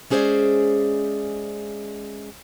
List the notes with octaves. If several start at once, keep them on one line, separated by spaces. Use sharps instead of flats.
G#3 C#4 G#4 C5 D5 E5